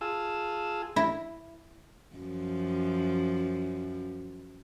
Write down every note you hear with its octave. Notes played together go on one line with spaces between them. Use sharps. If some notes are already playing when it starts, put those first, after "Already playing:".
F4 G#4 A5 E6
E4
F#2 F3